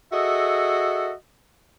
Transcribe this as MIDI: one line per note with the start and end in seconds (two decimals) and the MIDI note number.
0.11 1.11 66
0.11 1.11 68
0.11 1.11 69
0.11 1.11 75
0.11 1.11 76